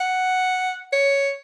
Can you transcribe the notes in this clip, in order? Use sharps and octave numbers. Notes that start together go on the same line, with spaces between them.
F#5
C#5